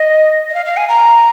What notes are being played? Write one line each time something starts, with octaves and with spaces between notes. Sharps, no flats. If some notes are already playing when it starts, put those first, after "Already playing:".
Already playing: D#5
D#5
F5
F5
G#5
A#5